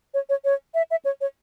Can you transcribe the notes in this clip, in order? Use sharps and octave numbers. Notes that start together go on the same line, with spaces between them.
C#5
C#5
C#5
E5
E5
C#5
C#5